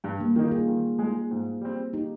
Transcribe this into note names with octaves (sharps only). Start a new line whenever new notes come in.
G2
G3 A#3
D#3 A#3 C#4 D#4 F4
F4 G#4
D#3
G#3 D#4
G#2
G3 C4
D#4 G4